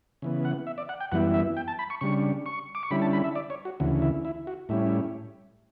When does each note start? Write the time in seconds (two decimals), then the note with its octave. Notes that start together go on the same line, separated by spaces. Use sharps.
0.22 C#3 E3 B3
0.45 F#5
0.67 E5
0.78 D5
0.89 F#5
1.00 G5
1.12 F#2 E3 G3 B3 E4 F#5
1.34 E5
1.57 G5
1.68 A5
1.79 B5
1.90 C#6
2.01 C#3 G3 D4 C#6
2.46 C#6
2.75 D6
2.83 C#6
2.91 D3 G3 C#4 E4 B5
3.02 A5
3.13 B5
3.24 E5
3.35 D5
3.50 C#5
3.65 F#4
3.80 D2 C#3 E3 F#4
4.02 E4
4.25 E4
4.47 F#4
4.69 A2 G3 C#4 E4